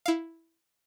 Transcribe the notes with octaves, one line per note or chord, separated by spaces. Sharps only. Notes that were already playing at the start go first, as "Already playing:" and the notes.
E4 F5